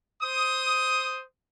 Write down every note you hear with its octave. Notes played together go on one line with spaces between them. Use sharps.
C5 D#6